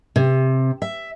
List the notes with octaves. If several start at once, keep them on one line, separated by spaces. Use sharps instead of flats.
C3
E5